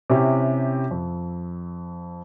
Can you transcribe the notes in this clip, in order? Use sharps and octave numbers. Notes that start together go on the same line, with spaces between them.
C3 C#4 E4 G4
F2